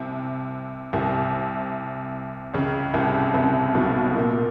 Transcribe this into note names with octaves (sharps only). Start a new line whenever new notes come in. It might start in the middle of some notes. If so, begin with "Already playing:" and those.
Already playing: C2 C3
C2 C3
C#2 C#3
C2 C3
C2 C3
B1 B2
A#2